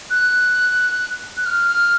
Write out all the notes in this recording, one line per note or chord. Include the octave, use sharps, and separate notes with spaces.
F#6
F#6
F6
F6